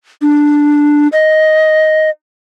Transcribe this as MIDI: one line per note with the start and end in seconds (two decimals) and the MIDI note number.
0.22 1.08 62
1.12 2.10 75